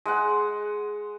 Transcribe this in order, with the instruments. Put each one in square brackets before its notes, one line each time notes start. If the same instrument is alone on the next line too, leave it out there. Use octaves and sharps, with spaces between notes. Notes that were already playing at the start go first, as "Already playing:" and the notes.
[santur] G#3 F#5